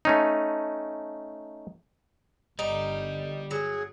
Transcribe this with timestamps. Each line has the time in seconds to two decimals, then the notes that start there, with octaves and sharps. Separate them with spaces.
0.05 A3 C#4 D#4
2.59 G1 D3 G3 D#4 D5
3.51 F#3 G#4